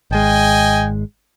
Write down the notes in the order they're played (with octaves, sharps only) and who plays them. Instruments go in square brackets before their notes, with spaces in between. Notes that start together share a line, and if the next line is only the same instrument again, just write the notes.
[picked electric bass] G#1 G#3 [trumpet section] D#5 G5 G#5